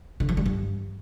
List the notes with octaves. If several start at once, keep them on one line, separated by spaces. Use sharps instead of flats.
D3
F3
G3
G2